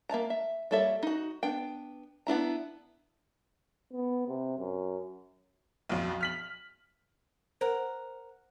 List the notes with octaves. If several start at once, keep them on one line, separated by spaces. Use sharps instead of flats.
A#3 E5 A5 A#5
E5
G3 A#3 A4 C#5 E5
D#4 F#4
B3 D4 G5
B3 D4 E4 A#5
B3
C3
F#2
B1 F2
F6 B6 F#7
A#4 C5 F#5